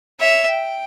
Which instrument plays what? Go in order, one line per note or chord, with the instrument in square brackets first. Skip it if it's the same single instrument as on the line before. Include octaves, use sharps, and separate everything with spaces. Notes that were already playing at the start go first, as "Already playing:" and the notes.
[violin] C#5 [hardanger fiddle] E5
[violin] G5